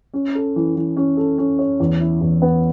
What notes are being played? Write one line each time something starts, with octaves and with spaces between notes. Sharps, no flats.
C#4
A4
E3
E3
C#4
A4
C#4
C#5
E2
E4
E2
B3